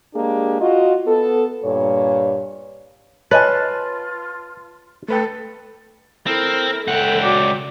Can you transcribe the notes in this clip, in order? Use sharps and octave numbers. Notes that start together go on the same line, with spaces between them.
G#3 A#3 D4 G4 G#4
F4 F#4 D#5
B3 A4
G2 A#2 C#5
F4 B4 C#5 D#5 G#5 A5 A6
A3 A4 B4 G5
C4 E4 A4 A#4
C#2 E5 F#5 G5
F#4 D5